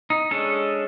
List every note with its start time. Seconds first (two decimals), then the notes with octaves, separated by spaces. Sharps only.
0.10 D#4
0.31 G#3 C#4 D4 A4